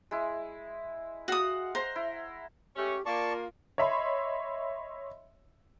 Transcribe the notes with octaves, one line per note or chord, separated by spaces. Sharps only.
G#3 E4
F#4 F5 F#5 D#6
C5 A#5 C6
E4
G#3 A3 C#4 G4
A#3 F4 D5 A5 C#6
C#5 D#5 E5 B5 C6